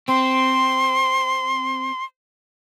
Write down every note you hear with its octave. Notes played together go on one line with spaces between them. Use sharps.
C4 C6